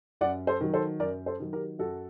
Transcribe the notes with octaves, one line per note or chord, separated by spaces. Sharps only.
F#2 D5 F#5
A4 C5
D#3 F#3
A4 C5
F#2 A#4 D5
A4 C5
D#3 F#3
G4 A#4
F#2 F#4 A4